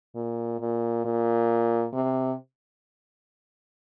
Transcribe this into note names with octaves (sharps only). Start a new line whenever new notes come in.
A#2
A#2
A#2
C3